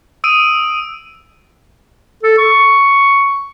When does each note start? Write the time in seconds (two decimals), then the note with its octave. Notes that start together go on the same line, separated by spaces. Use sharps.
0.24 D#6 E6 D7 D#7
2.23 A4
2.38 C#6